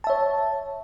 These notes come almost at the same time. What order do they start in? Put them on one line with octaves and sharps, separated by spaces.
A5 E5 C#5